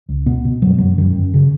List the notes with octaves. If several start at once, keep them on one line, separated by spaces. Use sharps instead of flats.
C#2
B2 B3
B2
F#2 F#3
G#3
F#2 F#3
F#2 D#3
F#2
C#3